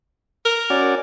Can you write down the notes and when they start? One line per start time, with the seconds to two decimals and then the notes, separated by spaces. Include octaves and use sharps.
0.45 A#4
0.70 C#4 F#4 D5